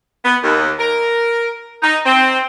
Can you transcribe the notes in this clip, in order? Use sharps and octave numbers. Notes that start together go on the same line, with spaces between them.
B3
D#2
A#4
D#4
C4